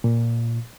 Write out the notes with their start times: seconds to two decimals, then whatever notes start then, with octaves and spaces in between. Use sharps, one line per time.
0.04 A#2